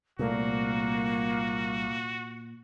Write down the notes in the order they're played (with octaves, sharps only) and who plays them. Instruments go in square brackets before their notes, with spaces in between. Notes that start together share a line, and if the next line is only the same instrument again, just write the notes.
[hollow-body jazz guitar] C2 A3 [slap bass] A#2 [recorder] A#3 [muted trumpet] F#4